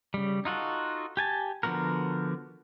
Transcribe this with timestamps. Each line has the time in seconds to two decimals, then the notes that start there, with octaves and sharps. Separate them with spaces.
0.14 C#3 G3
0.45 D#4 F4 F#4 A4
1.17 G4 G#5 A5
1.63 D3 F3 B3 F#4 A#4